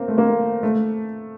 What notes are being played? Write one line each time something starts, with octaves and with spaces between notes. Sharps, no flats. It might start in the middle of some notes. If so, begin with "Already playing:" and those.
Already playing: A#3 C4
A3
A#3
A3